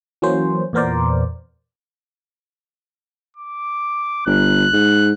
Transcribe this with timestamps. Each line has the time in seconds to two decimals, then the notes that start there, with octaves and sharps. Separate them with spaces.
0.22 E3 F#3 A#3 C#4 C5
0.73 E2 A#2 B3 A#4 C5 D5
3.36 D6
4.26 G1 F#6
4.73 G#2